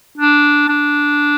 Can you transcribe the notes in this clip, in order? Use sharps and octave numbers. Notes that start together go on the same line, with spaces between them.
D4
D4